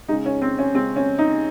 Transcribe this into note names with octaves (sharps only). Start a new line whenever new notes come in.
C#3 G#3 D#4
C#4
C4
C#4
C#3 G#3 C4
C#4
D#4